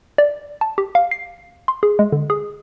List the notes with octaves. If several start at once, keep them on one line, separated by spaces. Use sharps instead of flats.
D5
A5
G4
F5
C7
C6
G#4
G#3
D3
G#4